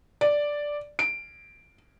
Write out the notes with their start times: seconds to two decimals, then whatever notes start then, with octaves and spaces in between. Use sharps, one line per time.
0.21 D5
0.99 D7